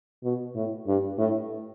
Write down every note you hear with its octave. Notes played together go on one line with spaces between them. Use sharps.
B2
A2
G2
A2